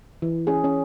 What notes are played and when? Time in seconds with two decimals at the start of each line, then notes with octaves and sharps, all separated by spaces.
0.22 E3
0.47 C#4 G#4
0.64 C#4